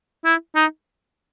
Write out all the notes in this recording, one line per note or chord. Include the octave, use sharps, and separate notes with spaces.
E4
D#4